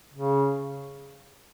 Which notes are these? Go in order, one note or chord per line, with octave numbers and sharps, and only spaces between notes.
C#3